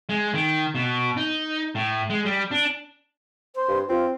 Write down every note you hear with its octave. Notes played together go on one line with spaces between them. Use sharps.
G#3
D#3
B2
D#4
A2
G#3
G3
D4
C5
G2
C4 F4